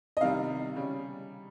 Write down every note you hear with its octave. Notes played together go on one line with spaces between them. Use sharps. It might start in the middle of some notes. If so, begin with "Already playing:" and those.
D#5
C3 D#3 G3 F5
C#3 G3 C#4